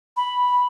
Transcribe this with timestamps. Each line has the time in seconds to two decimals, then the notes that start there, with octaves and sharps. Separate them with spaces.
0.17 B5